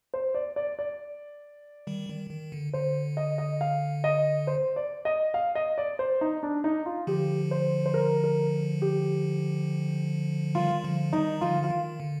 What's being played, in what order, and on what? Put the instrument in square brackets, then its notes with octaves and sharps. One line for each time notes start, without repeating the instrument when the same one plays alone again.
[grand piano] C5
D5
D5
D5
[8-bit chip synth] D#3 G3
D#3
D#3
D3
[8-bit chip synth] D3 [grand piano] C5
[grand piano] D#5
D#5
F5
D#5
C5
D5
D#5
F5
D#5
D5
C5
D#4
D4
D#4
F4
[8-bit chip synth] D3 F3 [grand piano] G4
[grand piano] C5
C5
A#4
A#4
G4
[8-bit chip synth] D#3 G3 [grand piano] F4
[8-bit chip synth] D3 F3
[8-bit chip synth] D#3 G3 [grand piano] D#4
[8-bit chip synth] D3 F3 [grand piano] F4
[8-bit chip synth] F3 [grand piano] F4
[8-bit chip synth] D#3
D3